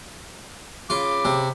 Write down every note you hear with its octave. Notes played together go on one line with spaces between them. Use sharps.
C#3 F4 B5 D6
C3